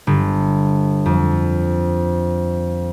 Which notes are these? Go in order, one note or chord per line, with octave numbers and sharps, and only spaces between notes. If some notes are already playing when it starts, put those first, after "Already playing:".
G1
F2